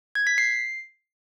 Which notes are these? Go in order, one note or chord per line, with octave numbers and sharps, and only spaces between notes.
G#6
B6
C7